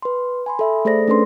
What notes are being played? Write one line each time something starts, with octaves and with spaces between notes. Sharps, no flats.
B4 C6
G#5 B5 C6
A4 E5 B5
A3 G#4 A4 C5 D5 A#6
A3 C#4 D4 A4 B4 C6